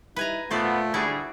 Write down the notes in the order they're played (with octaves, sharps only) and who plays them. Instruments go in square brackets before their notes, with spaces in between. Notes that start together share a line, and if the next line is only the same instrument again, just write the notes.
[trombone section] G3 D#4 E4 [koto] B4 G#5 A#5
[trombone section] A#2 F4 [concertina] A3 [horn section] B3 [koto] C5 D5
[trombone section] D3 [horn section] G3 G#4 [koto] E4 F#4 D5